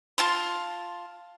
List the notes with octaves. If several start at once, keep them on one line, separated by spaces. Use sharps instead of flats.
F4 A5 C6